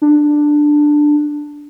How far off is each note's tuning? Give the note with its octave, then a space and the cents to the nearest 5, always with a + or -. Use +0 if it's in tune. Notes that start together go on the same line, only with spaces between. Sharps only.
D4 +10